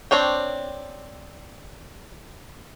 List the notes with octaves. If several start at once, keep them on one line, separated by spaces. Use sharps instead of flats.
C4 D4 C#5 G5